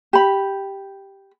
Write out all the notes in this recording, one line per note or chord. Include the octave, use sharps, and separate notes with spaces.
G4 B5